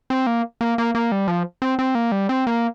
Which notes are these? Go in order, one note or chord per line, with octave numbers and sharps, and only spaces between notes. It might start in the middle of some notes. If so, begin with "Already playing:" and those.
C4
A#3
A#3
A#3
A#3
G3
F3
C4
C4
A#3
G3
C4
A#3